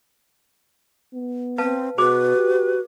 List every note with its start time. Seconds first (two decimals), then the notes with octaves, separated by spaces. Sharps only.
1.14 B3
1.58 C4 B4 F5 A5
1.98 B2 F#4 G#4 B4 C5 D6
2.37 G4